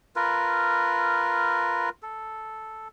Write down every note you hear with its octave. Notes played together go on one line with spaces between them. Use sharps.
F4 A#4 B4
A4